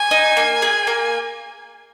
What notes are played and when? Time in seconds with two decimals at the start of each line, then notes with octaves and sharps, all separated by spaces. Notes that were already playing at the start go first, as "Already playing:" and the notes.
Already playing: G#5
0.11 D#4
0.37 A#3
0.62 G#4
0.87 A#3